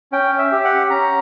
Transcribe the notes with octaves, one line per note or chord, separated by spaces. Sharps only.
C#4 G5
E5
G4
F#5
C#4 A#5